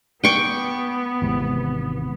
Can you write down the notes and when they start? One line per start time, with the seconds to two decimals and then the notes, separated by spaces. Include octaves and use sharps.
0.24 B3 G5 C#6 D6
1.22 G#1 E2 C3